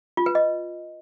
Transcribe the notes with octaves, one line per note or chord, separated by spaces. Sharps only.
F4
B4
D#5